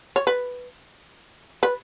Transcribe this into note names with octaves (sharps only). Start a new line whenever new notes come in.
C#5
B4
B4